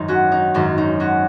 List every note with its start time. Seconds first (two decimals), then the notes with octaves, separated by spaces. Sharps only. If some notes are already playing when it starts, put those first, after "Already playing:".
Already playing: G#1 F#2 D#3 D#4
0.08 C#4 F#4
0.32 D#4
0.54 G#1 F#2 D#3 C#4
0.78 D#4
1.00 C#4 F#4